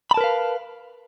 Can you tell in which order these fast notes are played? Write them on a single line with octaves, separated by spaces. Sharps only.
B5 A5 A#4 B4 F5